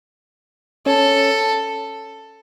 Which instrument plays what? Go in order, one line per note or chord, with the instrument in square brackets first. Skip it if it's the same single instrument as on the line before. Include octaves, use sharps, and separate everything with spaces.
[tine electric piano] C#4 C#5 [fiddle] A4